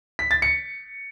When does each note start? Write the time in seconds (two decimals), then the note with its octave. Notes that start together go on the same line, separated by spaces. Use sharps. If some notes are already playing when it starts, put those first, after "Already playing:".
0.19 B6
0.31 A6
0.42 C#7